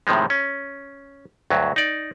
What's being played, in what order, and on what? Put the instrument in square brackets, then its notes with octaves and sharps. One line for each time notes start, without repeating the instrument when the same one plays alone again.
[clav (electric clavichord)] A2 C3 D#3 F3 G#3
C#4
D2 G2 F#3
D#4 D5